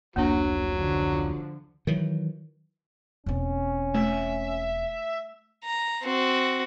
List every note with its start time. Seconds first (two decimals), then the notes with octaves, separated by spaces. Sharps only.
0.16 F1 C#2 F#3 A#3 D4
0.76 D3 F3
1.87 D#3 E3 F#3
3.26 E1 C4 C#4
3.95 A3 E5
5.64 A#5
6.03 C4 F#4